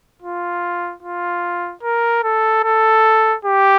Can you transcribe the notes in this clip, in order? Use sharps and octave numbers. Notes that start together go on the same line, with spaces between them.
F4
F4
A#4
A4
A4
G4